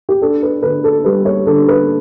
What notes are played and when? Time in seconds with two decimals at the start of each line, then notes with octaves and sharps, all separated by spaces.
0.09 G4
0.22 D4 A4
0.42 B4
0.62 D3 B4
0.84 A4
1.04 G3 B4
1.25 C#5
1.47 D3 A4
1.68 B4